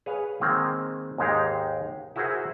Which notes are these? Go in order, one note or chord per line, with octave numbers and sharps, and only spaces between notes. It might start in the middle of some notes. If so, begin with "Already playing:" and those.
G#4 B4 C#5 F5
D#3 G#3 A#3 C4
D#2 G#2 G#3 D#4 G4 F5
E4 F#4 G#4 A#4 C5 F#5